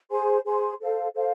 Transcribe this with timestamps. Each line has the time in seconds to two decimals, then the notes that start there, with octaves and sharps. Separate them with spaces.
0.11 G#4 C5 G#5 C6
0.45 G#4 C5 G#5 C6
0.80 A4 C5 F5
1.14 A4 C5 F5